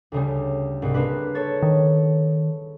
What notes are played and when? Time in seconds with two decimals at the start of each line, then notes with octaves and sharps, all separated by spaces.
0.12 D2 C#3 G3
0.82 C2 G#2
0.94 A#3 D4 B4
1.35 A4 C#5 A6
1.62 D#3